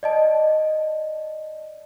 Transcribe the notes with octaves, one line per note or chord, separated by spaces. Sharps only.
D5 D#5 A5